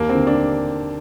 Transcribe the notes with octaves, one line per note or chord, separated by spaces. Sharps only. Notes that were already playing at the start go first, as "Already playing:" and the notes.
Already playing: D#2 A#3
C4
D3
D4